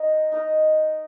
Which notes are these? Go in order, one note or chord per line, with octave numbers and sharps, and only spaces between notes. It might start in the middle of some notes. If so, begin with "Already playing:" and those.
Already playing: D#4 A#4 D#5
D#4 A#4 D#5